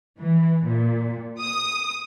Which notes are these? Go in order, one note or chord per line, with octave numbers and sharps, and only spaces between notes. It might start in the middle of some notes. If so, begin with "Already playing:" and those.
E3
A#2
D#6